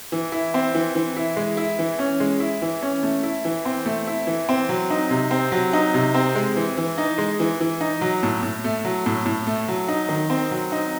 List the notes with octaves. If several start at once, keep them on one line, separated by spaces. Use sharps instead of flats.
E3
E4
C4
E3
E3
E4
G#3
E4
E3
C#4
G#3
E4
E3
C#4
A3
E4
E3
C4
A3
E4
E3
C4
F#3
D#4
C3
C4
F#3
D#4
C3
C4
G#3
E3
E3
D#4
G#3
E3
E3
D#4
F#3
A2
A2
A3
F#3
A2
A2
A3
F#3
D#4
D#3
C4
F#3
D#4